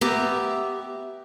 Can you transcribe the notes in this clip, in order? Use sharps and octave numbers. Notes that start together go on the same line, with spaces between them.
B3 G4 E5 A#5